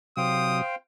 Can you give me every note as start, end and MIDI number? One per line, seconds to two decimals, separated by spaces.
0.17 0.61 48
0.17 0.61 54
0.17 0.75 72
0.17 0.75 77
0.17 0.75 79
0.17 0.63 87